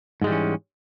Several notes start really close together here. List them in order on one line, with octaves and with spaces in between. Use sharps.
G#2 G#3 G3 E3 C#4